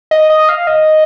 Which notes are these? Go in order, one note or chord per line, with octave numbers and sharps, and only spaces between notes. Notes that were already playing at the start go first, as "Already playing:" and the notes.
D#5
D#5
F5
D#5